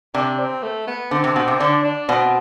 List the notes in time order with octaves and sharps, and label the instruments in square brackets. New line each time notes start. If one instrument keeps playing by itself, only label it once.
[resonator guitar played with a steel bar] C3 [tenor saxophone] D4
[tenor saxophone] C4
A3
B3
[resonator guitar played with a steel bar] D3 [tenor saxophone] C4
[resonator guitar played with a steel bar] C3
B2
C3
[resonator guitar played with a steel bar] D3 [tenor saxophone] D4
[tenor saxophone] D4
[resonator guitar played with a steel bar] B2 [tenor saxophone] C4